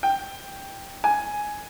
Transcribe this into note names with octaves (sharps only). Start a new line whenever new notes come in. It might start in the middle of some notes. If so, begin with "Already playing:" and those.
G5
G#5